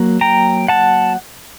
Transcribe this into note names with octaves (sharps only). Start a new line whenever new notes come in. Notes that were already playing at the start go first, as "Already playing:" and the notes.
Already playing: F#3 A#3
G5 A#5
F#5 A5